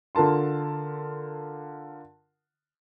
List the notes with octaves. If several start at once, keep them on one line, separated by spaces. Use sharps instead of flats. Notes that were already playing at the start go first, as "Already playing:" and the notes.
D3 F4 A#4 A5 C6